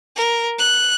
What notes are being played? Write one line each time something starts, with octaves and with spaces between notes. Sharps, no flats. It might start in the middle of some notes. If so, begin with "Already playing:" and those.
A#4
F#6